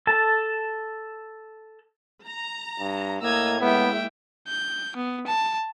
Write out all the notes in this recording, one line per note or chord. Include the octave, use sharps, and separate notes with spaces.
A4 A5
A#5
G2
A2 A#3 D#5 A#5 E6 G#6
G#3 A#3 B3 E4 E5 G5
G6
B3
A5